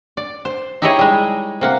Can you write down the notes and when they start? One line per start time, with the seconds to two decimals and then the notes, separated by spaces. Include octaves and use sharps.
0.17 D5
0.45 C5
0.82 D#4 E4 G4 G#4 C#5 D#5
0.99 G3 G#3
1.61 C3 A#3 F#5